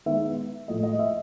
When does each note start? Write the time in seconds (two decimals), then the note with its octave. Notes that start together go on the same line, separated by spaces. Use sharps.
0.06 D#3 G#3 B3 D#4 E5
0.68 A2 F3 A3 D#5
0.83 D#5
0.99 E5